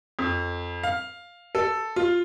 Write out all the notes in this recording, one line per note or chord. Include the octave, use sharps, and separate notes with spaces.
F2
F5
A4
F4